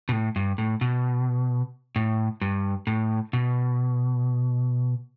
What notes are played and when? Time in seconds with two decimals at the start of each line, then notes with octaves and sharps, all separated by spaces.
0.09 B2
0.12 A2
0.36 G2
0.58 A2
0.81 B2
1.96 A2
2.41 G2
2.87 A2
3.33 B2